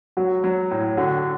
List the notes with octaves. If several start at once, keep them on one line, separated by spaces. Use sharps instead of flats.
F#3 F#4
F#3
A2
D3 F#4